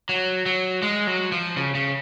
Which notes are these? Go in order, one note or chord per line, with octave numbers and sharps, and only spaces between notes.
F#3
F#3
G#3
F#3
F3
C#3
C#3